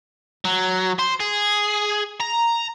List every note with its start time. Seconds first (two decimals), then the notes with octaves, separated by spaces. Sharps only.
0.45 F#3
0.99 C5
1.20 G#4
2.20 A#5